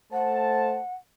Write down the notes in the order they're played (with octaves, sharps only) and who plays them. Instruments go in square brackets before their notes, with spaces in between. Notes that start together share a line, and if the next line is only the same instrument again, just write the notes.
[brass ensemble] A3 C5 A5 [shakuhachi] F#5